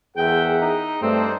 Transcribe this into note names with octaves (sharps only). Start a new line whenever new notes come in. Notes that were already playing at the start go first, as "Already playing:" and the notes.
E2 G#4 A#4 E5 F#5 G5
D#4
G2 A3 C4 D4 D#4 C5